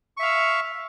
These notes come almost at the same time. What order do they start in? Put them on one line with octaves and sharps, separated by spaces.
C#6 E5 F5 E6